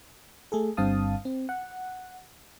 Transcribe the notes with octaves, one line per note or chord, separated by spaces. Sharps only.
A3 G#4 A4
G1 G2 C4 F5 A5 D#6
C4
F#5